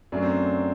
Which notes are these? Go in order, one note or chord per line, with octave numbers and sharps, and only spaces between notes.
F#2 F#3 A3 D4
C4